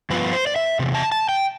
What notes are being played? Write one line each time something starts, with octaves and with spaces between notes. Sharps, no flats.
G2 F3 B3 F4 B4
C5
D5
E5
E2 C3
A5
A5
G5